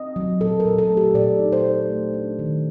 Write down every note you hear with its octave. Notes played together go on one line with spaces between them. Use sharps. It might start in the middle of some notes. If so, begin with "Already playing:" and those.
Already playing: C4 D#5
F#3
A#2 A4
A#4
A#2
A4
A3
G4
A#2 D5
D#4
C5
D#4
A3
D4
D#3